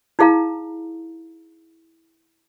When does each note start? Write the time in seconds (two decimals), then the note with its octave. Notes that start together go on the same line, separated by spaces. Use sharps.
0.19 D#4 E4 G#4 F5 A#5